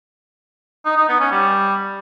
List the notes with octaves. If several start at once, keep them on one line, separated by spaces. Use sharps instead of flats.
D#4
D#4
B3
C#4
G3